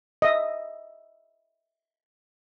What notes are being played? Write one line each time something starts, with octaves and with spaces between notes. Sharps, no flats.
D#5 E5